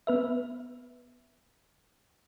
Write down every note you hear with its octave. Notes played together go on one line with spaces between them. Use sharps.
B3 B4 E5